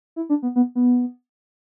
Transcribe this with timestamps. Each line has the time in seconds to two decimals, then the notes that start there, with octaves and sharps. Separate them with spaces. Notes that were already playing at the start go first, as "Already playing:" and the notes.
0.16 E4
0.29 D4
0.43 B3
0.56 B3
0.75 B3